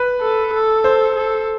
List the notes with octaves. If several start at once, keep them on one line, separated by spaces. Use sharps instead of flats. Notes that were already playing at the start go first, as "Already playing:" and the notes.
Already playing: B4
A4
A4
C5
A4